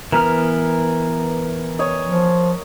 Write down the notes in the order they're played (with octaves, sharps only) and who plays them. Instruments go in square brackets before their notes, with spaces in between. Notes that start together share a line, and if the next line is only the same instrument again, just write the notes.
[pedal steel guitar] E3 B3 F6 [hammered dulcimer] A#4
[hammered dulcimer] C#5 D#5
[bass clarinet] F3